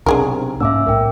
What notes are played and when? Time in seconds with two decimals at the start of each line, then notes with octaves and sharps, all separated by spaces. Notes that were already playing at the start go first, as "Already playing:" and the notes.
0.06 B1 C3 D4 G#4 A#4
0.60 G#2 A#3 C#4 E5 D6 E6
0.87 B1 A2 A#4 G5